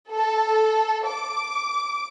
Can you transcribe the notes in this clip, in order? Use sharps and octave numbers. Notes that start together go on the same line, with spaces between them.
A4
D6